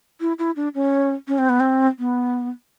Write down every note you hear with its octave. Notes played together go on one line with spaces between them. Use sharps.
E4
E4
D4
C#4
C#4
C4
B3
C4
B3